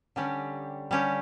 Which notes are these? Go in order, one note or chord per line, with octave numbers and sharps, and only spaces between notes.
D3 G3 C#4 G4
D3 G3 C#4 G4